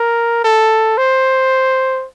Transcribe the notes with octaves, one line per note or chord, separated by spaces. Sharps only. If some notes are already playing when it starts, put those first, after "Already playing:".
Already playing: A#4
A4
C5